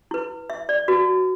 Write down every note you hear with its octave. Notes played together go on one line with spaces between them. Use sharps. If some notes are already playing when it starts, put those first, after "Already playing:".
E4 B4
E5
D5
F#4 B4